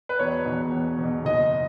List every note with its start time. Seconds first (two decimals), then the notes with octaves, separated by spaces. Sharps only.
0.09 B4
0.19 E1 C#5
0.46 E2 B2
0.72 E1
0.98 E2
1.03 B2
1.25 F#1 D#5